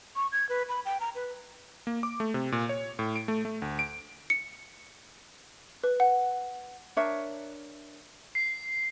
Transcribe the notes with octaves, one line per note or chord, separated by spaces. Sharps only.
C#6
G#6
B4
B5
G5
A#5
B4
A#3
D6
A3
C3
A#2
C#5
A2
D7
A3
A3
D2
D7
C#7
B4
F#5
D4 A#4 C#5 E5
C7